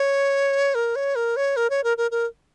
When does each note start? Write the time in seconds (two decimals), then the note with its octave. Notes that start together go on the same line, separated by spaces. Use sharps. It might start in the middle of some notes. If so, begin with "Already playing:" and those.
Already playing: C#5
0.75 A#4
0.96 C#5
1.15 A#4
1.36 C#5
1.56 A#4
1.70 C#5
1.84 A#4
1.98 A#4
2.11 A#4